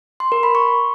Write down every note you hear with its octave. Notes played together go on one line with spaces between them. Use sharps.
C6
A#4
B5
C#6